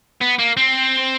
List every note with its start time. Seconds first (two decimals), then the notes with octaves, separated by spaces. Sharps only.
0.21 B3
0.39 A#3
0.57 C4